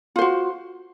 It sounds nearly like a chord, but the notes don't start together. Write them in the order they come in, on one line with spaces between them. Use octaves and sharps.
F4 C5 F#4